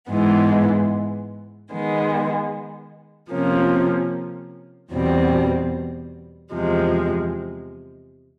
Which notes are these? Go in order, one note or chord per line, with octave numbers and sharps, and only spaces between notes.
G#2 E3 G#3 B3
D#3 G#3 B3
C3 F3 A#3 C#4
E2 B2 G3 C4
E2 C3 F3 G#3